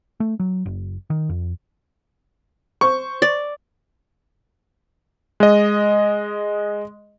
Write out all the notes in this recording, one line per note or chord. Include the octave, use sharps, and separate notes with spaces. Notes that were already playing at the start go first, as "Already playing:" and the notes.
A3
F#3
F#1
D#3
F2
C5 C#6
D5
G#3 D#5